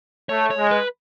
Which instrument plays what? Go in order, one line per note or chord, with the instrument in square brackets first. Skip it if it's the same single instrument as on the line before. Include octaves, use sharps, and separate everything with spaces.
[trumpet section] A3 [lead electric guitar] C#5
[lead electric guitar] C#5
[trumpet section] G#3
[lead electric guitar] B4